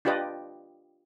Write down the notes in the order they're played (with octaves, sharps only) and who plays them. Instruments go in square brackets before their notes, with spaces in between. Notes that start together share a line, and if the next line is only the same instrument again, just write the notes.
[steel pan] D4 F4 G4 B4 D5 D#5